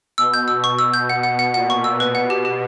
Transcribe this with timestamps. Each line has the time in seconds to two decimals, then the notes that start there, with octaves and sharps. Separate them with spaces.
0.18 B2 E6
0.34 G6
0.48 E6
0.64 B2 C#6
0.79 E6
0.94 G6
1.09 B2 F#5
1.23 F#5
1.39 F#5
1.54 A#2 F#5
1.70 C#6
1.84 E6
2.00 B2 B4
2.15 F#5
2.30 G4
2.45 G4